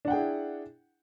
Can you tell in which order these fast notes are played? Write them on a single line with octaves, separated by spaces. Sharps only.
D4 F#5 G5 G#4 E4